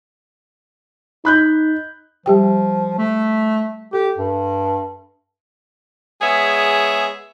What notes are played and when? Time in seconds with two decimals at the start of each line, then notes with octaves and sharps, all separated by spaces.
1.25 D#4 B5 F#6 G6
2.26 F3 G3 G4 G5
2.98 A3
3.93 G4 A4
4.18 G2
6.22 G#3 B3 G#4 C#5 E5